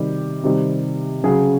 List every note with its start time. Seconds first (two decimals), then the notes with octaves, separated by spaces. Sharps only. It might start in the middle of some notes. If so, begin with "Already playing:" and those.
Already playing: C3 D#3 G3 G4
0.44 C3 D#3 G3
1.24 C#3 F#3 G#4